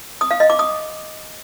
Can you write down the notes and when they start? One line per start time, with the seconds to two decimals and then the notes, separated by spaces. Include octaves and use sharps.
0.21 D#6
0.31 F5
0.40 D#5
0.50 D6
0.59 D#6